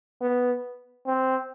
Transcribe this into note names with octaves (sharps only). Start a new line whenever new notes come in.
B3
C4